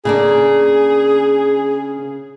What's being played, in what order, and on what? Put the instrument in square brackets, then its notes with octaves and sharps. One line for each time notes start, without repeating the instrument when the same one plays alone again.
[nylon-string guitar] C#3 A#3 D4 [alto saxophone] G#4